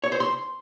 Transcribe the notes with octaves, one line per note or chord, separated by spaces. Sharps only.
C#5
C5
C6